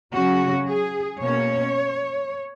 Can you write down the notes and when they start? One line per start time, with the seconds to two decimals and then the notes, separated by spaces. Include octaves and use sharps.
0.12 C#3 F#3 C#4 F#4
0.66 G#4
1.21 B2 A#3 C#4 C#5